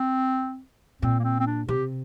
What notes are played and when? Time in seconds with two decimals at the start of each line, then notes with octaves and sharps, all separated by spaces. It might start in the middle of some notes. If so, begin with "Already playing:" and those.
Already playing: C4
1.02 A#2 C4
1.19 A#3
1.24 C4
1.40 C4
1.47 D4
1.68 C3 G4